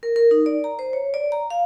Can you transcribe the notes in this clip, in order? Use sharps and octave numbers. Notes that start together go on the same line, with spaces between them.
A#4
A#4
D#4
D5
A#5
C5
C#5
D5
A#5
F5